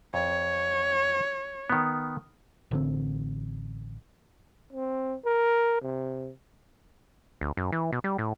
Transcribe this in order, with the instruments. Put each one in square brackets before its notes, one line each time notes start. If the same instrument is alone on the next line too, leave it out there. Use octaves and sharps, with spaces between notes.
[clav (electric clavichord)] F2 [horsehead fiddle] C#5
[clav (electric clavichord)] D#3 B3
[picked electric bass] A1 D3 C4
[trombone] C4
A#4
C3
[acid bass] D2
F#2
E3
B2
G3
A2